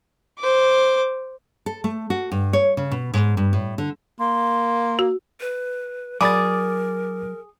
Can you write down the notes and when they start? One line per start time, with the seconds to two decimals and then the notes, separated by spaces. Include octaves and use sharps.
0.39 C5 D6
1.66 A4
1.84 A3
2.10 F#4
2.32 G2
2.53 C#5
2.77 C#3
2.91 B2
3.14 G#2
3.37 G2
3.53 A2
3.78 D3
4.20 A#3 C6
4.99 F#4
5.41 B4
6.21 F#3 G#4 A#4 D5 B5 D6 A6